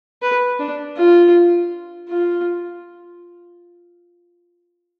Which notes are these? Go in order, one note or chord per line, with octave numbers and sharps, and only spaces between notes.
B4
D4
F4
F4